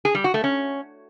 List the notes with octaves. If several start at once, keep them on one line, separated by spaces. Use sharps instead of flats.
G#4
G3
F#4
A3
C#4